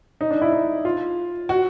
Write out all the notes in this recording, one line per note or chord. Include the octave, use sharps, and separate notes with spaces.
D#4
D4
E4
D#4
F4
F#4